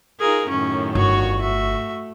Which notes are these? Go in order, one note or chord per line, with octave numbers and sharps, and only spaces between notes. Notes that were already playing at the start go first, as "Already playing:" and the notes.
D#4 F4 G#4 A#4
F#2 A2 D#3 C#4
G1 F#4 C#5
A3 F#4 E5